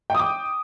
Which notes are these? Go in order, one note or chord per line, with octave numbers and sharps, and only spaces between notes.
G5 D6 D#6